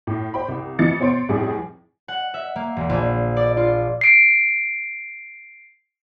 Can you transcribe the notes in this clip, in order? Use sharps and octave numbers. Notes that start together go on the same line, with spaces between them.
A2
C5 G5 B5
C2
F2 E3 A6 C#7
B2 C5 C#5 C6 D7
F1 A2 C3 G3 G#4
F#5
E5
A#3
E1
A#1
D5
F4
C7 D7